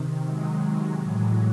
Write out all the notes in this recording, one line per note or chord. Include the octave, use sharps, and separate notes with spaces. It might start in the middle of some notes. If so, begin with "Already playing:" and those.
Already playing: C3 D#3
F#3 G#3
A2 E3 F#3 G#3